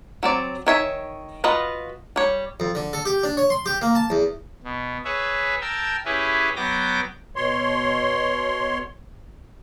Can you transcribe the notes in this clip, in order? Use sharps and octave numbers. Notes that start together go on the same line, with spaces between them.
F#3 C4 D5
D#3 C#5 E5 G#5
F4 F#4 B4 D#5 F5
G3 C#5
F2
D3
A4
G4
D4
C#5
C6
G4
A#3
A5
E2
B2
G#4 B4 C#5 E5
A#4 G5 A5 E6
C#4 E4 G4 G#4 B4
F#3 B3 G5 D6 A#6
B2 C#5 C6